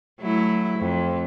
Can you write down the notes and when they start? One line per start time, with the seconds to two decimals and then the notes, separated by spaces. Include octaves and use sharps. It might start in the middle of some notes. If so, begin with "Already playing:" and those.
0.20 F#3 A3 E4
0.79 F2